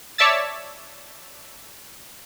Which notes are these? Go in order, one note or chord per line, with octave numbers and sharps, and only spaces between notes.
C#5 D5 E5 A5 E6 A6